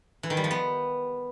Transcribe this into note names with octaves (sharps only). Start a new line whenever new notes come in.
E3
D#3
G3
F3
B3